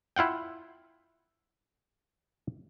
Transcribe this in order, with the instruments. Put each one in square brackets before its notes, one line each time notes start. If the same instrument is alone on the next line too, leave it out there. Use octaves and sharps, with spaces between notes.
[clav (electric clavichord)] E4 F4 F#5 G5